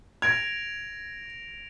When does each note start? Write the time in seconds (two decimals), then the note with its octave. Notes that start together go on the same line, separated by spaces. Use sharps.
0.22 G#6 A#6 D7 F7